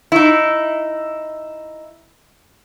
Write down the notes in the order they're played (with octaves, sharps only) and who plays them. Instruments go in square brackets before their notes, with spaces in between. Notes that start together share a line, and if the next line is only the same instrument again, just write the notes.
[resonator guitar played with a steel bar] D#4 E4